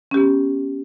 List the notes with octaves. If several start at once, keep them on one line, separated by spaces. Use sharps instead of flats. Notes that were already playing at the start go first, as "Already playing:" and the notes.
B3 C#4 G4